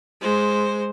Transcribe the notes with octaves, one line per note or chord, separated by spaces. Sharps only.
G#3 C5